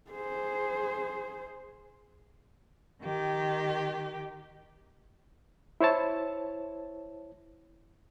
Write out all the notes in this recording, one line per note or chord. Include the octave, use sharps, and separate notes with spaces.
G#4 C5
D#3 G4
E4 C5 C#5 A5